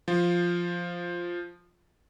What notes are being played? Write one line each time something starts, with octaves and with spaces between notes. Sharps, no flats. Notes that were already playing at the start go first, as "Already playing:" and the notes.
F3 F4